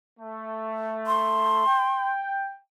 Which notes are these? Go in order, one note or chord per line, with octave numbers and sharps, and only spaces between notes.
A3
C6
G5